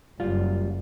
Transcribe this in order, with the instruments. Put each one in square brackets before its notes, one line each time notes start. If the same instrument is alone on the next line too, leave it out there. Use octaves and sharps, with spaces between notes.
[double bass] F#1 [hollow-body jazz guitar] G3 F4